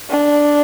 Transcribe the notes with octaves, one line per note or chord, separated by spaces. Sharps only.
D4